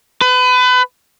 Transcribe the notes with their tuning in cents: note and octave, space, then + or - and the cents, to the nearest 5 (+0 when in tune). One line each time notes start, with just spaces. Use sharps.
B4 +30